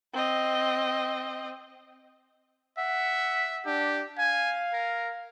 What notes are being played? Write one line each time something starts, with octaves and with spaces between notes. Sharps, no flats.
C4 D#5
E5 F#5
D4 G4
F5 G#5
A#4